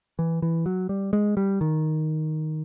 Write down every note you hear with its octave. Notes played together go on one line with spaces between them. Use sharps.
E3
E3
F#3
G3
G#3
G3
D#3